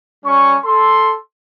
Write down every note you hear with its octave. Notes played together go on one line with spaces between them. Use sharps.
G3 C#4 C#6
A4 C6